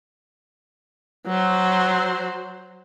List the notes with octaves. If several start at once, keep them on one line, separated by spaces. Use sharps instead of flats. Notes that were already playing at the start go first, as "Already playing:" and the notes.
F#3 C5